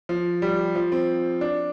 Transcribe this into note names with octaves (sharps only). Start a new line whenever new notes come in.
F3
G3
F3
C4
D4